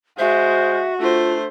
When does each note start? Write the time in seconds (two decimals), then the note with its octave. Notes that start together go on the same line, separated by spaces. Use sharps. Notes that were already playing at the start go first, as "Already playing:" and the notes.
0.19 G#3 F#4 C5 E5
1.00 A3 D4 F4 C5